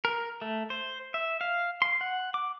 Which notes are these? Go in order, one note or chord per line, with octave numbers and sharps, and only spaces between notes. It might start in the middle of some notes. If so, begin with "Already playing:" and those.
A#4
A3
C5
E5
F5
C6
F#5
D6